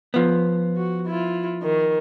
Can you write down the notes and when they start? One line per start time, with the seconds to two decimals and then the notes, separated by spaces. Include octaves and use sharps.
0.14 F3 B3
0.77 F#4
1.06 E4 F4
1.62 D#3